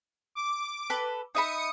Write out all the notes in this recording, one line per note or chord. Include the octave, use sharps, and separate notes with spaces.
D6
A4 B4
D#4 E5 B5 D#6 C#7